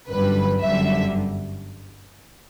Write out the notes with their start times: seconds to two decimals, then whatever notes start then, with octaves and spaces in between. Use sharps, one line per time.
0.09 G1 F#2 D3 G3 B4
0.62 G1 F#2 D3 G3 E5